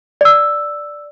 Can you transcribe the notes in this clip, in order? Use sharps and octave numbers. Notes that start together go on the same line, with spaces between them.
D5 E6